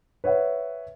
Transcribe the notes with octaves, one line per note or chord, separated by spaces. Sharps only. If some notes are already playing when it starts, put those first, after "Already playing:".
B4 C#5 E5 F#5